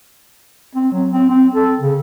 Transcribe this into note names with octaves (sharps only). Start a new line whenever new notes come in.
C4
F#3
C4
C4
A4
C#3